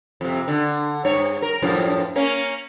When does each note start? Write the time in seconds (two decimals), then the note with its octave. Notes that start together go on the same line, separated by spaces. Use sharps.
0.21 F2 C3
0.48 D3
1.05 G2 C#5
1.42 A#4
1.62 F#2 A2 F3
2.16 A#3 C#4